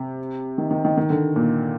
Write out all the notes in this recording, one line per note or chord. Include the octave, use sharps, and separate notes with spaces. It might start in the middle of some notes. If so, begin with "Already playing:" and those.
Already playing: C3
D#3
D#3
D#3
D#3
D3
A#2